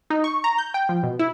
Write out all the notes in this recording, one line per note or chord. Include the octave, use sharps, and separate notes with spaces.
D#4
C#6
A#5
G6
G5
F3
B2
E4